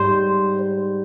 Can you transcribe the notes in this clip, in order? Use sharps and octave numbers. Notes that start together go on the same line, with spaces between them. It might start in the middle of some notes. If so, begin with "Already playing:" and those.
Already playing: G#2 G3 C5